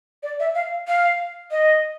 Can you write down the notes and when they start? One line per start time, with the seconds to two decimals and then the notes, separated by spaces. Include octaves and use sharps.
0.23 D5
0.40 E5
0.55 F5
0.88 F5
1.51 D#5